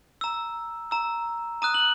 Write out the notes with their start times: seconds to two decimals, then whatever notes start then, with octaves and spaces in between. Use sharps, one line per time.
0.21 A#5 E6
0.91 A#5 E6
1.62 A#5 D#6 F#6 D#7
1.74 F#7